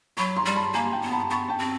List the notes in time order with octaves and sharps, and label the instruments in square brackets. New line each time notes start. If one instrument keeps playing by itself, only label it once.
[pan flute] F#3 [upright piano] B5 C#6
[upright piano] A#5 C6
[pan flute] G3
[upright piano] A5 B5
[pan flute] A#3 [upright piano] G#5 A#5
[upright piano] G5 A5
[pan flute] B3
[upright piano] A5 B5
[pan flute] B3 [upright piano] B5 C#6
[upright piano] G5 A5
[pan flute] C4